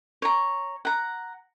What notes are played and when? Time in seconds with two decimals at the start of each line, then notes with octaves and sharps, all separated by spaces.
0.22 C#5 A#5
0.85 F#5 A#5